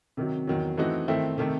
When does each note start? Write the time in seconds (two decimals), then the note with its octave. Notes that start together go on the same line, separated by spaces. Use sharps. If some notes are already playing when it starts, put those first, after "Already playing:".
0.17 C3 D#3 F#3
0.47 E2 D#3 F#3
0.77 E3 A3 C4 D#4 F#4
1.08 D#3 A3 C4 E4
1.38 C3 D#3 A3